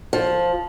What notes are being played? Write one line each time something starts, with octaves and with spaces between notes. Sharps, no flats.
F3